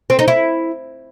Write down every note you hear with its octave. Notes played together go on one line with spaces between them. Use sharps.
C4
D#4
E4